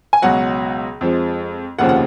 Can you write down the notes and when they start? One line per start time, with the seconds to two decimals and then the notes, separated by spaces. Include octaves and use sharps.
0.13 G#5
0.22 C#2 B2 F#3 F#5
1.01 F2 F3 G#3
1.79 F1 D#2 C#3 F3 F#5
1.89 F#5